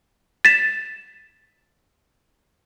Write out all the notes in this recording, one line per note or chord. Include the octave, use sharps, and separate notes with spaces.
A6 B6 E7